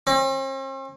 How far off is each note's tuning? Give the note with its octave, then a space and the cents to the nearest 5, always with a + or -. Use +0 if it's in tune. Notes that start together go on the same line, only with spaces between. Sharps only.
C4 +45